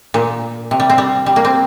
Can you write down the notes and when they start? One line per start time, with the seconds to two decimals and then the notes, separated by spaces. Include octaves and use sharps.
0.14 A#2
0.71 C3
0.80 G3
0.90 C4
0.98 G3
1.26 G3
1.36 A#3
1.45 C4